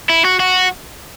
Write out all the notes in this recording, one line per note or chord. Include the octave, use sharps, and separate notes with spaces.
E4
F#4
F#4